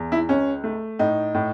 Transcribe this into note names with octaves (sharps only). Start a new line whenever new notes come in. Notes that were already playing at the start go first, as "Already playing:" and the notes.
Already playing: E2
E4
C#2 C#4
A3
A2 D#4
A2